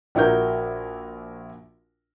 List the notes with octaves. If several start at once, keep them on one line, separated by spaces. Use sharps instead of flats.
A#1 E4 F#4 A#4 G6